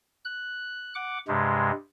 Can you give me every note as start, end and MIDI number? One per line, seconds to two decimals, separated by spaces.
0.25 0.94 90
0.95 1.18 78
0.95 1.18 86
1.28 1.71 43
1.28 1.71 48
1.28 1.71 56